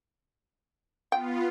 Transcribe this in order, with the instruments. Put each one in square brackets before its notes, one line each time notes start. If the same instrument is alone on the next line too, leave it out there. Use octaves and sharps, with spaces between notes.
[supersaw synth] B3 F4 [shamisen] G5